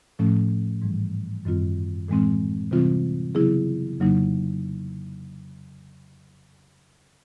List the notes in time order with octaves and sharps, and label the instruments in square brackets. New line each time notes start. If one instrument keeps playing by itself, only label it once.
[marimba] A2 F3 A3 C#4
G#2 E3 G3
F#2 D#3 G3 C4 F4
A2 E3 G#3 C4
C3 E3 G3 C4 F4
C#3 F#3 B3 E4 G#4
F2 C#3 F#3 A#3 D#4